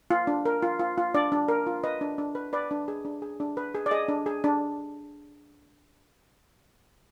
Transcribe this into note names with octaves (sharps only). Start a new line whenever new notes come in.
F4
D4
A#4
F4
F4
F4
D4 D5
D4
A#4
F4
B4 D#5
D4
D4
B4
B4 D5
D4
G#4
D4
G#4
D4
B4
G#4
D5
G#4 D#5
D4
G#4
D4